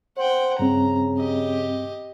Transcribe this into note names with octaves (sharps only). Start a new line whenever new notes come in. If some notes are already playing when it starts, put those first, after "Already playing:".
C5 F#5 G5
G2 C#3 C4 A#5
G4 D#5